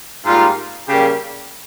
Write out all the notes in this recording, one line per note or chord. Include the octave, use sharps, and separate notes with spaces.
G#2 G3 A#3 F4
C#3 G3 A#3 G4